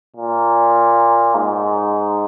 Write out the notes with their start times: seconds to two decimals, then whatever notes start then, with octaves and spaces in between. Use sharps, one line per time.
0.17 A#2
1.35 G#2